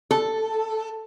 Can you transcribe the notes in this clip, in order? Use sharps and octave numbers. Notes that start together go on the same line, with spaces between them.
A4